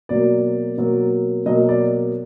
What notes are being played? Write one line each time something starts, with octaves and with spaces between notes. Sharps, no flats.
B2 F#3 A#3 D5
B2 F#3 A#3
B2 F#3 A#3 D#5
D5